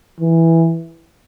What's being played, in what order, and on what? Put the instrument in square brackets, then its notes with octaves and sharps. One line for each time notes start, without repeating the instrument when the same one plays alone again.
[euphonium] E3